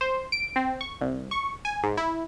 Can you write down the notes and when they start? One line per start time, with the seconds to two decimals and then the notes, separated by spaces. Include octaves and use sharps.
0.01 C5
0.32 D7
0.56 C4
0.81 C#6
1.01 C2
1.31 C#6
1.65 G#5
1.83 G#2
1.97 E4